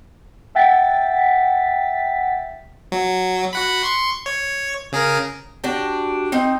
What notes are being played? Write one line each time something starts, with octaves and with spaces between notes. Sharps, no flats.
E5 F#5 G5 A6 B6
F#3
F#4 F#5 B5
C6 C#6
C#5
C#3 G#4 A#4
D4 F#4 G4
C4 D#4